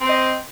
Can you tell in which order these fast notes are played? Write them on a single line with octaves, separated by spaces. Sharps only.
C4 C5 D#5